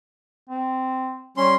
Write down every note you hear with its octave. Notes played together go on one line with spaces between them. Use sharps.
C4
G3 C#4 C6